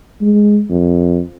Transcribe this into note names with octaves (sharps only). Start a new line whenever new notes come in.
G#3
F2